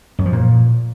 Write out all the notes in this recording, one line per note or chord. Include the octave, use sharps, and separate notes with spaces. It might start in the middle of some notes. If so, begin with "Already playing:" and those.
F#2
F3
A#2